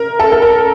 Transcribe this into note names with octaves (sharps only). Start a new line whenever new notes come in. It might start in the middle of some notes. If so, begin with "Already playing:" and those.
Already playing: A#4
A4
A4
A#4